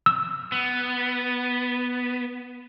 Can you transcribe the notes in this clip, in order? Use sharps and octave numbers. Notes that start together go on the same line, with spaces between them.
E6
B3